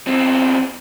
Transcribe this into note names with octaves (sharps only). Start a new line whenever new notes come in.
E2 C4